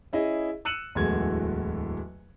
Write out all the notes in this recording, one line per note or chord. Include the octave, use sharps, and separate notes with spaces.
C#4 E4 G#4 D#5
E6 F#6 C#7 D#7 E7 F#7
D1 E2 G#3 A3 F#4 G#6